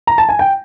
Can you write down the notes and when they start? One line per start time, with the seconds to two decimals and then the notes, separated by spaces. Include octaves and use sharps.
0.07 A#5
0.18 A5
0.29 G#5
0.39 G5